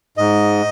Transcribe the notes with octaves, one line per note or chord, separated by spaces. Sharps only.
G#2 D#5